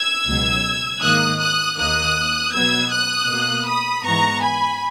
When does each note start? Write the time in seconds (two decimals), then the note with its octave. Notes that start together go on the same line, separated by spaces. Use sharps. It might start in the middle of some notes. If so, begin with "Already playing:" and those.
Already playing: E6 G#6
0.26 C#2 B2 F#3
1.02 G#2 D#3 A#3 D#6 F#6
1.39 D#6 F#6
1.77 D#2 D#3 A#3 D#6 F#6
2.53 B2 F#3 B3 E6 G#6
2.91 D#6 F#6
3.29 B2 A#3
3.66 B5 D#6
4.04 G#2 E3 B3 A#5 C#6
4.42 G#5 B5